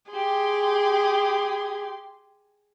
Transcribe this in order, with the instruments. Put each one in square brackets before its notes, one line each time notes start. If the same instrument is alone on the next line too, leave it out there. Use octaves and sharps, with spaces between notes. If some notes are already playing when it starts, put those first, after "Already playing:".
[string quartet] G4 C6 [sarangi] G#4